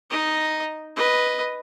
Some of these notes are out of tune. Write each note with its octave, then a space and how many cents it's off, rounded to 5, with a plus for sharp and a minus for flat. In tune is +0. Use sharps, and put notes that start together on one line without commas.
D#4 +0 D#5 +0
B4 +0 D#5 +0